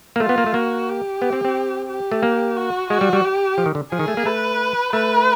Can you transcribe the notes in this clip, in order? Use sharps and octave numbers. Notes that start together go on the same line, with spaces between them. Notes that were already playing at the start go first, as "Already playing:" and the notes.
A#3
A3 F4
B3
A#3
A3
A#3 F#4
G4
B3
C4
C4
G4
A3
A#3
F#4
G#3 F#4
G3
G3
G4
F3
D#3
D3
F3 G#4
D#3
A3
A#3
A3 B4
A3 B4